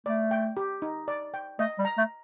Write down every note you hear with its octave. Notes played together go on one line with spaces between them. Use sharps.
A3 D5
G5
G4
D#4
D5
G5
A3 D#5
G3
A#5
A3